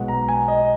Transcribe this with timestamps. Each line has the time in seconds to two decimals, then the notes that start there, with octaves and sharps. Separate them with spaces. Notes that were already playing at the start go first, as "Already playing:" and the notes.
Already playing: B1 B2 G#3 F#5
0.08 A#5
0.28 G#5
0.48 D#5